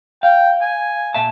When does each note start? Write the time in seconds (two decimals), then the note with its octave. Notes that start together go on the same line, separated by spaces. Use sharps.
0.23 F5 G5
0.61 G#5
1.14 A#2 E5 A5